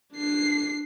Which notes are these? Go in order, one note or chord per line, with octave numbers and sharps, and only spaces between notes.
D4 C7